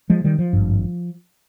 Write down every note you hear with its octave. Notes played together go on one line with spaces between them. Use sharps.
F3 G#3
D#3 G3
F3
G#1 G2